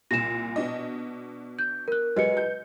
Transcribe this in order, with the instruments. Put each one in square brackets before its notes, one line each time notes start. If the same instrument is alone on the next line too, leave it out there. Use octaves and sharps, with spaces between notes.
[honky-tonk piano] C2 A#2 [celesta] A#6 E7
[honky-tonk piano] B2 D4 D#5
[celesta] G6
A#4 F#6
[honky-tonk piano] F#3 G#3 [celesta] B4 D#5 C#7
[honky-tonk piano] G6